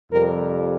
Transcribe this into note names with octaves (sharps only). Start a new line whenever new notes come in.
F2 C3 G3 A#4